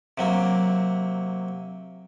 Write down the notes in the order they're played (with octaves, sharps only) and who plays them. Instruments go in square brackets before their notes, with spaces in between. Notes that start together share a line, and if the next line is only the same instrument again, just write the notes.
[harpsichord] C3 F#3 A#3